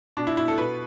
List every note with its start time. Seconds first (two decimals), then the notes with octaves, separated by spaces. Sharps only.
0.17 B2 D4
0.27 E4
0.37 B2 E4
0.48 A4
0.58 B2 B4